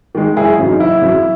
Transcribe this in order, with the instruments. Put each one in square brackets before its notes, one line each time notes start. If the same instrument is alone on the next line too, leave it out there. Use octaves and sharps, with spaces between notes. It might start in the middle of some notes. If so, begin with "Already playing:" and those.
[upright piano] D#3 G#3
F#1 E4 G#4
F#2 C#3
D#4
F#1 E4
F#2 C#3